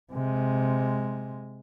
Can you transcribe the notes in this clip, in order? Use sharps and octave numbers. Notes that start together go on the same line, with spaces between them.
C3 G#3